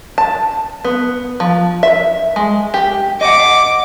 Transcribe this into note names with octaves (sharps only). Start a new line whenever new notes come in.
A5
B3
F3
E5
G#3
G4
D#5 F#5 D6